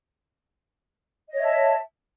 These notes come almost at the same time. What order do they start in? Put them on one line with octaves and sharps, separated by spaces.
D#5 C#5 E5 A5